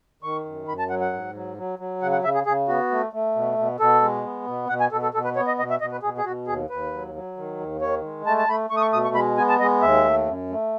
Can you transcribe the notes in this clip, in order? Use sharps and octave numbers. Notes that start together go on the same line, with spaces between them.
D#3 C#6
F#2
F#2 B5
A5
F#3 F#5
F#5
G#2
F#3
F#3
F#3
C#3 F#5
F#5
C#3 E5
G#4
C#3 G#4
B3 F#4
A3
A3
B2
B2
B2 A4
G#3
B3
B2
B2 F#5
G#5
B2 A4
A4
B2 A4
B4
B3 C#5
D#5
B2 D#5
E5
B2 D#5
B4
B2 G#4
G#4
B2 F#4
D#2 G#4
D#2 B4
F#3
F#3
D#3
D#2
D#3 C#5
G#3
A3 A5
A5
A3 B5
A3 C#6
D#6
C#6
B2 D#6
C#6
G#3 B5
B3 G#5
A5
G#3 D#5
D#2 E5
A3
F#2
A3